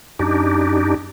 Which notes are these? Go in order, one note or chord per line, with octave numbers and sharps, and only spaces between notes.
F#2 D4 D#4 G4